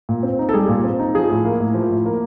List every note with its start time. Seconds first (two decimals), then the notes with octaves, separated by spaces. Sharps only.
0.09 A#2
0.23 C4
0.39 D#4
0.49 A4
0.53 G3 G#4
0.69 A#2
0.84 C4
0.99 D#4
1.14 F3 G#4
1.30 A2
1.45 A#3
1.60 A2
1.74 F3
1.90 A2
2.06 A#3